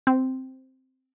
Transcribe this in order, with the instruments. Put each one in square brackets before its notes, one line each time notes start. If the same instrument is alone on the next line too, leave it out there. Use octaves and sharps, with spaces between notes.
[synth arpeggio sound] C4